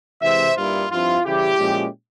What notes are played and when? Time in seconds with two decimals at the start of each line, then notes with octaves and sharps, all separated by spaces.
0.22 C3 E3 G#3 E4 C5 E5
0.56 G2 G3 A#3 E4 F4
0.90 G2 F3 C4 E4 F4
1.25 C#3 E3 G3 E4 G4
1.58 A#2 F3 G#3 C#4 E4